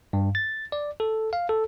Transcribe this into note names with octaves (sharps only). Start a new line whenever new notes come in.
G2
A6
D5
A4
F5
A4